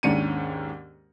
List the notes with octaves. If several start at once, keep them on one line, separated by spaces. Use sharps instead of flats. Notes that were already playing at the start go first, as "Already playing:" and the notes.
D#2 G#2 C#4 D4 C#7 D#7